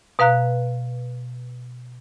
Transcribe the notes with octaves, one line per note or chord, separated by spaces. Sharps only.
B2 B4 F5 A#5 F#6